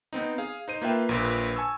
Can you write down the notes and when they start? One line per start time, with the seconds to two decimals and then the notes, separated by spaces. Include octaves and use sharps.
0.13 B3 C4 D#4
0.38 G#4 F5
0.68 D#4 C5 D#7
0.82 A#3 F4 B4 E5 G5
1.09 A#1 A#2 B4
1.56 G#5 A5 C#6 E6